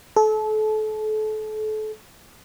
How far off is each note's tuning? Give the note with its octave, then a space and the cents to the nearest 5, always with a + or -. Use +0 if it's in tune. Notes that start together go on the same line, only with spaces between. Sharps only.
A4 -30